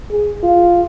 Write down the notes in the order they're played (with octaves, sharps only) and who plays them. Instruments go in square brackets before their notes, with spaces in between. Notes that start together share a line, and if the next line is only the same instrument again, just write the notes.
[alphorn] G#4
F4